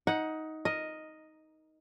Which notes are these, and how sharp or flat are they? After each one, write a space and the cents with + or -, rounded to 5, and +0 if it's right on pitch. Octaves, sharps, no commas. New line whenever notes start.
D#4 +15 F#5 +0
A#4 +5 D#5 +0